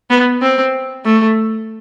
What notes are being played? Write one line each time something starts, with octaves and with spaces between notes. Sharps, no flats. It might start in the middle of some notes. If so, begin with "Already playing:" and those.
B3
C4
A3